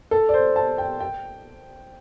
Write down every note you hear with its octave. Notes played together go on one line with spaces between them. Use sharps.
A4
D5
C5
A5
G5
G5